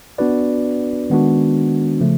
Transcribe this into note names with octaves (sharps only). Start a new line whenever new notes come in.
B3 D4 F#4 B4 D5
D#3 G#3 B3 D4 F#4
C#3 F3 A3